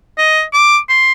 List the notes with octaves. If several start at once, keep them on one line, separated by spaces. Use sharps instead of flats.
D#5
D6
C6